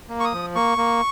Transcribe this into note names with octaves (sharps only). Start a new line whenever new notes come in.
A#3
C#6
D#6
F3
A#3 C#6
A#3